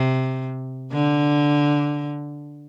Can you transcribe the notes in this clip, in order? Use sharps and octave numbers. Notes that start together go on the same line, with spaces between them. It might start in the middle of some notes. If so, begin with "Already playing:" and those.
Already playing: C3
D3